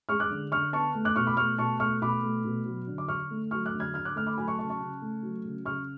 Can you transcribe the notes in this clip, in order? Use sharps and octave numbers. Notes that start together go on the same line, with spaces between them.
G#3 C#6 F6
D6 F#6
D3
D3 C#6 F6
B3 A5 C#6
A3
D6 F#6
B2 C#6 F6
B5 D6
A3 C#6 F6
B2 A5 C#6
A3 C#6 F6
B2 B5 D6
A3
B2
F#3
D3
D6
D3 C#6 F6
A3
F#3 C#6 F6
D6 F#6
D3
F6 G#6
D3 F6 G#6
D6 F#6
A3 F6
B5 D6
F#3 G#5 B5
A5 C#6
C#3 A5 C#6
A5 C#6
C#3
A3
F#3
C#3
C#3 C#6 F6